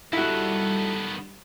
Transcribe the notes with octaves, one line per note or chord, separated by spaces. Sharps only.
D#3 G3 B3 E4 F#4 A4